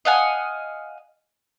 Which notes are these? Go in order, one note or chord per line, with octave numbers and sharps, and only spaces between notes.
D#5 F5 F#5 G#5